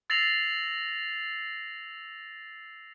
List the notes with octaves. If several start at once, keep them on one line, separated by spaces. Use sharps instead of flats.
E6 A6 A#6 C7 F7 F#7